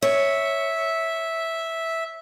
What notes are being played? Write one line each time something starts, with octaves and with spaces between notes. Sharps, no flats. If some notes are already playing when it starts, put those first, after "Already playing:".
C#5 E5